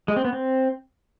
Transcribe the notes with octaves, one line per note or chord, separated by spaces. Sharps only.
G#3
C4
B3
C4